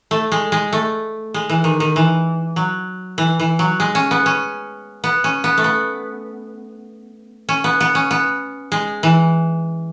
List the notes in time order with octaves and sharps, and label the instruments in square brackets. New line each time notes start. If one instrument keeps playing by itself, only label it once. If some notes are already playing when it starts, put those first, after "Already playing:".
[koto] A3
G#3
G#3
A3
G#3
E3
D#3
D#3
E3
F#3
E3
E3
F#3
G#3
C#4
B3
C#4
B3
C#4
B3
A3
B3
C#4
B3
B3
C#4
B3
G#3
E3